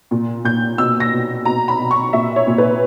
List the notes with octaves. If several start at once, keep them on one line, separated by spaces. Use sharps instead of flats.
A#2
A#2 G6
B2 E6
A#6
B2
B2 A#5
B5
B2
C#6
A#2 E5
C#5
A#2
B4